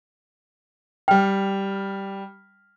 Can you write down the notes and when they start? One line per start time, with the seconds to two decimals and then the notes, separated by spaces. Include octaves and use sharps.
1.08 G3 G5 F6